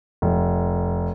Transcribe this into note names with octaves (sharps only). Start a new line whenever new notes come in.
F1